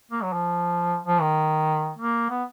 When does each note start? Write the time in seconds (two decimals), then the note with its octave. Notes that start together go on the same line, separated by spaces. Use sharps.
0.11 A#3
0.23 F#3
0.33 F3
1.05 F3
1.21 D#3
1.98 A#3
2.30 B3